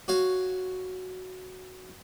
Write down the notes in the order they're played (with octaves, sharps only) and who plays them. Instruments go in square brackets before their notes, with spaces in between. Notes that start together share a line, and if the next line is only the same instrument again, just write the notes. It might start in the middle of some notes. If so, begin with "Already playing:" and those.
[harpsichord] F#4 C#5 F5